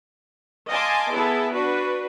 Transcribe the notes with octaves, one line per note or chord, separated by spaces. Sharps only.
D#5 F5 G#5 A5 C6 D6
B3 E4 G#4 A4
D4 F#4 B4